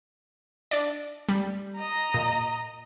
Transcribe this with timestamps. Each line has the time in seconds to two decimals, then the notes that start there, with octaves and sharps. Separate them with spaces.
0.71 D4 D5
1.29 G3
1.78 D#5 A#5
2.14 A#2